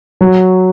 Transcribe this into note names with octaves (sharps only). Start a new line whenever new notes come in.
F#3